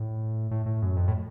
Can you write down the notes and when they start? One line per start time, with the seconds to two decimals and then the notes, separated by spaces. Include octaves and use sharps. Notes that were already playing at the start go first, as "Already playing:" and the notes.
Already playing: A2
0.51 A2
0.66 A2
0.82 F#2
0.97 F2
1.08 A2